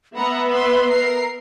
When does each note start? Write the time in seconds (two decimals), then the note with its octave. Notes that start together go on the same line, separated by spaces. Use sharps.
0.16 B3 E5 F#5 A#5 B5
0.50 B4 B5 C6
0.91 A#4 C7